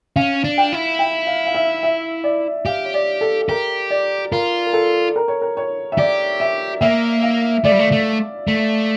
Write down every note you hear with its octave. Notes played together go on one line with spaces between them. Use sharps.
C#4 F5
D4
G5
E4
G5
F5
F5
E5
E5
D5
G4 F5
C#5
D5
A4
G4 A#4
D5
F4 A#4
A#4
A4
A#4
C#5
A#4
C#5
E5
G4 D5
E5
A#3 E5
F5
A3 D5
G3
A3
A3
A3